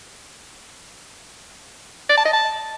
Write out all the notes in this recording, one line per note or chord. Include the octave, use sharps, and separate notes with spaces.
D5
A5
D#5
A5